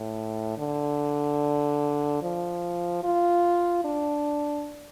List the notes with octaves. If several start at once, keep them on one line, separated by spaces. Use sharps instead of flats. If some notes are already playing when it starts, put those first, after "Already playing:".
Already playing: A2
D3
F3
F4
D4